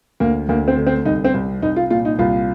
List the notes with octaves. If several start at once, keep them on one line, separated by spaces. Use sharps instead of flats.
D2 A#3
D2 A#3
C4
D3
C4
C2 D#4
C4
C2
C2 D#4
F4
A#2 F4
D#4
C2 F4